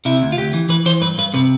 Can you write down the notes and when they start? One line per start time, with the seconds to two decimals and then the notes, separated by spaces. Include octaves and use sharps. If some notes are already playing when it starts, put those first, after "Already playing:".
0.05 C3 E4
0.22 D2
0.32 F4
0.37 D2 G4
0.53 E3
0.69 E3 B4
0.86 E3 C5
1.01 G2 B4
1.18 G2 B4
1.34 C3 B4